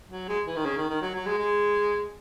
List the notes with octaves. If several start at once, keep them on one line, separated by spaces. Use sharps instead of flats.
F#3
G#3
E3
D#3
C#3
D#3
D#3
F#3
F#3
G#3
G#3